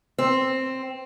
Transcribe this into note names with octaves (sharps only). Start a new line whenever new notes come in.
C4